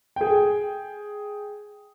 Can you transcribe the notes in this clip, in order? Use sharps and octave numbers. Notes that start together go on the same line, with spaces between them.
G#4 G5